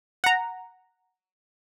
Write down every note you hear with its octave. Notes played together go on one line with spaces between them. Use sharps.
F#5 A#5